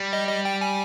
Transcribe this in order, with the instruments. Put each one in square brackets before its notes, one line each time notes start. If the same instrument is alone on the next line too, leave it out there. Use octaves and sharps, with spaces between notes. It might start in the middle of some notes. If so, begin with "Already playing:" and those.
Already playing: [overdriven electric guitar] G3
[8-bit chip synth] D#5
D#5
G5
G#5